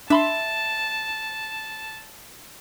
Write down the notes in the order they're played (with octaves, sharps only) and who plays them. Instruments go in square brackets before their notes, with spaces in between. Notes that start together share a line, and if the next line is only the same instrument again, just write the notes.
[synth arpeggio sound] D4 B5 C6 [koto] E5 [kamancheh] A5